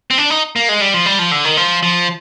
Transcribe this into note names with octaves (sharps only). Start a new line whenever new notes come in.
C4
D4
D#4
A#3
G#3
G3
F3
G3
F3
D3
D#3
F3
F3